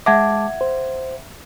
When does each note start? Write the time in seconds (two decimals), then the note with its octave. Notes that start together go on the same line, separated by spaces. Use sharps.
0.06 G#3 E5 F#5 A5 D6 G#6
0.61 C5